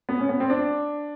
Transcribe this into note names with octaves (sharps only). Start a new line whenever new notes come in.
B3
C#4
B3
C4
D4